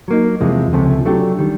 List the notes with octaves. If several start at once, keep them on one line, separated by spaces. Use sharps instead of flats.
F#3 A#3 D#4
E2 C3 F3 G#3
C#2 C3 F3 A3 C#4
F#3 A3 D4 G4
D#3 G3